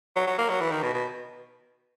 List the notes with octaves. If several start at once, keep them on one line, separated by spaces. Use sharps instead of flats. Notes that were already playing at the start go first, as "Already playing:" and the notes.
F#3
F#3
A#3
F#3
E3
D#3
B2
B2